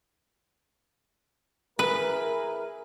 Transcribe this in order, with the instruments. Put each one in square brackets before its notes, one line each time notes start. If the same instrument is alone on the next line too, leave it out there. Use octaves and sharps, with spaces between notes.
[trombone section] E4 G#4 A#4 [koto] B4